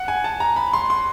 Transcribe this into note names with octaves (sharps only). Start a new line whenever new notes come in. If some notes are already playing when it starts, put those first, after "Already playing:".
Already playing: F#5
G#5
A5
A#5
B5
C6
C6